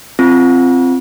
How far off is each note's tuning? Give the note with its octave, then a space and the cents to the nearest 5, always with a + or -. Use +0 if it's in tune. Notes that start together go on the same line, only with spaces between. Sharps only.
C4 +0 F4 -20